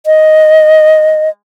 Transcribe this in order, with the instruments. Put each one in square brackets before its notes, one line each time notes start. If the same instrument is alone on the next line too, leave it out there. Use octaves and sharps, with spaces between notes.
[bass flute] D#5